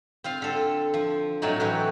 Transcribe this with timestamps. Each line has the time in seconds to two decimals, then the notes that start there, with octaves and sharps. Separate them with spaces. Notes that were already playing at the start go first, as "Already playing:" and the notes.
0.24 C4 F4 F5
0.42 D3 A4
0.94 F3
1.42 A2 F#3 C4 D#4 D5
1.60 E3 F#3 F#4